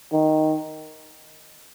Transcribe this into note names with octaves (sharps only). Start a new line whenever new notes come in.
D#3